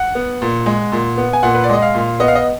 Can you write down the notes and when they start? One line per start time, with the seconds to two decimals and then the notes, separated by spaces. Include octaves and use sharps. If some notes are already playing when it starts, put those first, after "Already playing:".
Already playing: F#5
0.15 B3
0.42 A#2
0.66 G#3
0.92 A#2
1.18 B3
1.33 G#5
1.43 A#2 F#5
1.55 B4
1.64 D5
1.69 G#3 D#5
1.82 F5
1.95 A#2
2.20 B3 D#5
2.28 F5
2.35 D#5